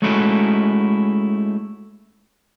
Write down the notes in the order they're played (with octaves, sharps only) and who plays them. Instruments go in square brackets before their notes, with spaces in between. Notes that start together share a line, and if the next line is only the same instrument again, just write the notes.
[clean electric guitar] G#3 A3 C#4 D#4 E4 F#4